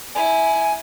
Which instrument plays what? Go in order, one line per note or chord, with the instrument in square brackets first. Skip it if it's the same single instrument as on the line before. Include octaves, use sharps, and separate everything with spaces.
[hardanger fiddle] E4 [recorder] G#5